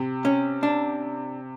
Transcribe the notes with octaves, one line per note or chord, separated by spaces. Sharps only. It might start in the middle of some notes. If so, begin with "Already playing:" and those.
Already playing: C3
C#4
D4